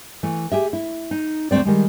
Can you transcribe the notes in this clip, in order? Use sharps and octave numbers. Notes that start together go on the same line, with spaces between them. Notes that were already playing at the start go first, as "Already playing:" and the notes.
E3 A3
G4 G#4 E5
E4
D#4
D2 A3 A#3 C4 D5
D#3 G3 G#3